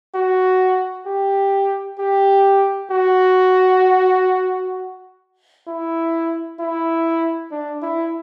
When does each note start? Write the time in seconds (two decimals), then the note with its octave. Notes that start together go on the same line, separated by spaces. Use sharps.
0.14 F#4
1.06 G4
1.99 G4
2.91 F#4
5.68 E4
6.59 E4
7.52 D4
7.82 E4